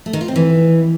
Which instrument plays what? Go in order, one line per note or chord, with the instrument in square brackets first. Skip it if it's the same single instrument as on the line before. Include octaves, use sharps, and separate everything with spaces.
[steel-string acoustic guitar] A3
D#3
F4
C4
E3